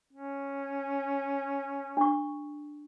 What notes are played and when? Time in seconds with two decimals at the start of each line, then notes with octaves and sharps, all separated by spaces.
0.13 C#4
1.97 D4 C#6